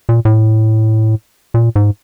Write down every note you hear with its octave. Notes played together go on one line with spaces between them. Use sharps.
A#2
A2
A#2
G#2